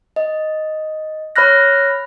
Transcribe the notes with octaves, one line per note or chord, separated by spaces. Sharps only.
D#5
C#5 B5 F6 F#6 A#6